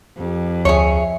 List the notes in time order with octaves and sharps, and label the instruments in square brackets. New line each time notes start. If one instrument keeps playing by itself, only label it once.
[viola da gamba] F2 [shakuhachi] G4
[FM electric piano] D2 [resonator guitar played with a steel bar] G#4 C#5 [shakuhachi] E5